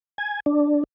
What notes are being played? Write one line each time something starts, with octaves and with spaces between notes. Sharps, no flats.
G#5
D4